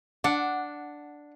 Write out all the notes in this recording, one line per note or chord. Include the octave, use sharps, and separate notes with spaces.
D4 F#5